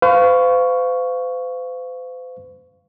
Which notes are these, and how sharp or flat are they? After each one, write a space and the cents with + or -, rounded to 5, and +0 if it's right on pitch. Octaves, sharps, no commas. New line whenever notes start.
C5 -45 F5 +0 C#6 +5